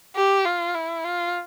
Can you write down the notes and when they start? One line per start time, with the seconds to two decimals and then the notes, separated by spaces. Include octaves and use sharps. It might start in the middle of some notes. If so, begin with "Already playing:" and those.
0.16 G4
0.45 F4
0.75 E4
1.04 F4